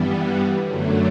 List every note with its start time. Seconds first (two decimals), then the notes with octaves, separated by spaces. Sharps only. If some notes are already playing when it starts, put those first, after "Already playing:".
Already playing: G2 E3 G3 B3
0.61 F#2 D3 F#3 A3